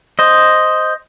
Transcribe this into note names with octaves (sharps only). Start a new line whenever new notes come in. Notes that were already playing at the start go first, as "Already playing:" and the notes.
C5 D#5